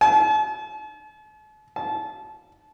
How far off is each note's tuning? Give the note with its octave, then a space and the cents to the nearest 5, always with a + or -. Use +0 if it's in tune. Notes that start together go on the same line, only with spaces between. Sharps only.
A5 -45
A5 -25